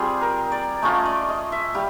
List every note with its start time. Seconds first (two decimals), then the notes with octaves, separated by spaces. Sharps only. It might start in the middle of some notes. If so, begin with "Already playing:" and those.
Already playing: G3 C4 F4 G#4
0.21 A#4
0.52 D5
0.82 A3 C#4 F4 D#5
1.05 D5
1.29 D#5
1.52 E5
1.75 G3 F5